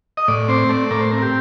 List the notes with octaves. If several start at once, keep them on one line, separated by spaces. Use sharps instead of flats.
D#5
A2 D5
C4 C5
A3 D5
A2 A#4
C5
C4 A#4
G4